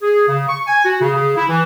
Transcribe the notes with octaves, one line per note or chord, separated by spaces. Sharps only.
G#4
C#3
C#6
G#5
F#4
C#3
C#3
E4
E3